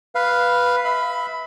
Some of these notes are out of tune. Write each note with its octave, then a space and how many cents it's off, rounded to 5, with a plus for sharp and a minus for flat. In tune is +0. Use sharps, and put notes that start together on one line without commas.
B4 +0 F5 +0
E5 -25 B5 +10